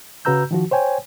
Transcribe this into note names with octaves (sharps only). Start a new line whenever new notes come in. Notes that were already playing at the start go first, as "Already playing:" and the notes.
C#3 F#4 B4 A#5 E6 G6
D#3 F3 F#4
C5 C#5 G5 G#5